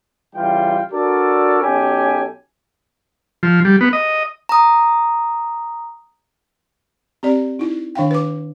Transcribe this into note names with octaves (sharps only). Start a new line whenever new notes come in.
C#3 E3 G3 F4 G5
D4 F#4 A4 A#4 C#5 D5
B1 C#4 G4 A4 G#5
F3
G3
B3
D#5
A#5 D#6
C4 G4 D5
D#4 E4
D#3 D4 F5 G5
B4 D6